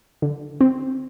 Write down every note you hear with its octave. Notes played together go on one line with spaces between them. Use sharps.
D3
C4